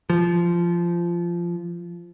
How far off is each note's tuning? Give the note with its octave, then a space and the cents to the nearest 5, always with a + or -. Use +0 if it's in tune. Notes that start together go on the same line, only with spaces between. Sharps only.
F3 -15